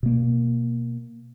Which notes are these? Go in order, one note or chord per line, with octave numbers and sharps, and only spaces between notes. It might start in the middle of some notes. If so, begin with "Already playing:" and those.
B2 A#3